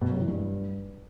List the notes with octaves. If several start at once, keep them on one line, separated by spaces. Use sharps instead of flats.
B2
F#2
C3
E3
G2